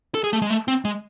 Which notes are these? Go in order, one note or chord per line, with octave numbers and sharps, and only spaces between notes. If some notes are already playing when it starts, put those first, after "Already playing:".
A4
G#4
A3
G#3
A3
C4
G#3